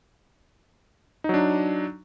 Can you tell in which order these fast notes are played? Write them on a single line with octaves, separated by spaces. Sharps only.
D#4 F#3 D4